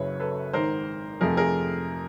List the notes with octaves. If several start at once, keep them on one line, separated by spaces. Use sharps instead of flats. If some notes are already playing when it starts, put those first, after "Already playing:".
Already playing: F#1 F#2 C#3 F#3 B4 C#5
A4 B4
G#1 G#2 D#3 A#4 C5
F2 C3 F3 A3 G#4 A#4
G#4 A#4